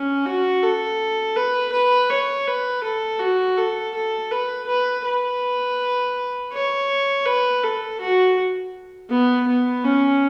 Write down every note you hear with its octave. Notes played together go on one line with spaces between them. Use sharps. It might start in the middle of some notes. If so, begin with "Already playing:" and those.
Already playing: C#4
F#4
A4
B4
B4
C#5
B4
A4
F#4
A4
A4
B4
B4
B4
C#5
B4
A4
F#4
B3
B3
C#4